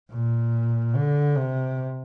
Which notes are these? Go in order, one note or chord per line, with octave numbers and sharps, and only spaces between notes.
A#2
D3
C3